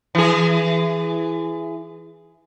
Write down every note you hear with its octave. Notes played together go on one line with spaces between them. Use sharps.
E3 G#4